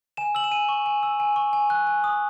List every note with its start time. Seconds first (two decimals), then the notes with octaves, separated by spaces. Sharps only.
0.17 G#5 E7
0.35 E6 F#7
0.44 E7
0.51 G#5 D#7
0.69 C#6
0.86 G#5
1.03 E6
1.20 G#5
1.36 C#6
1.53 G#5
1.70 F#6
1.87 G#5
2.04 D#6